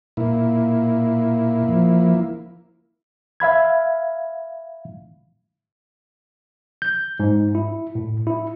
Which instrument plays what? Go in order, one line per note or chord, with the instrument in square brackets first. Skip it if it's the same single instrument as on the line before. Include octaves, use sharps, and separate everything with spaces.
[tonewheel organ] A#2 [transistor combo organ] A#3 E4
[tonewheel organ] F3
[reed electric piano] E5 F5 B5 G#6
[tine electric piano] G6
G#2
E4
A2
E4